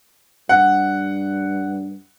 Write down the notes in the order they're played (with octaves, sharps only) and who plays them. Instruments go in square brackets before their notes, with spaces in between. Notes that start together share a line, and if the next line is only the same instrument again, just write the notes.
[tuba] G2 [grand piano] F#5